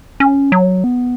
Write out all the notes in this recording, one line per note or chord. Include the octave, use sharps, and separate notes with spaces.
C#4
F#3
B3